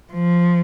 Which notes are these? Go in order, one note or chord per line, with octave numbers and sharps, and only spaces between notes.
F3